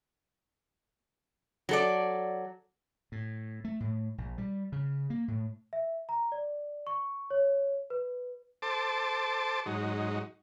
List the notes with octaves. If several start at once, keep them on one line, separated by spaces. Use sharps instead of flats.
F#3 A4 D5
A2
A3
A2
A#1
G3
C#3
A#3
A2
E5
A#5
D5
C#6
C#5
B4
A4 C5 A5 D6
G#2 F#3 D#4